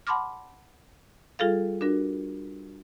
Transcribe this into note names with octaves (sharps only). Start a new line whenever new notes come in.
F#5 A5 B5 C6 D6 F6
G3 F4 G#4 A4 F5
D4 F#4 A#4